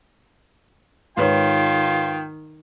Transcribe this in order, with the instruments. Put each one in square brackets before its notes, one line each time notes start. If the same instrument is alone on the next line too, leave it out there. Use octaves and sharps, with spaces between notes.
[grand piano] G#2 B4 C#5 [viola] D#3 [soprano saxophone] F4 [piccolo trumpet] G5